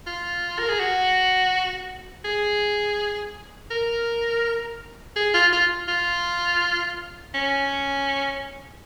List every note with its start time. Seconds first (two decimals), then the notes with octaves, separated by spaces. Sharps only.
0.07 F4
0.59 A#4
0.69 G#4
0.80 F#4
2.25 G#4
3.71 A#4
5.16 G#4
5.34 F4
5.52 F4
5.88 F4
7.34 C#4